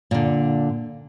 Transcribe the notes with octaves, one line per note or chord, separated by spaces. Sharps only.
A#2 D3